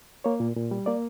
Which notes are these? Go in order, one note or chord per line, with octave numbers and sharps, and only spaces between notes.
A#3 C#5
A#2
A#2
G3
A#3 D5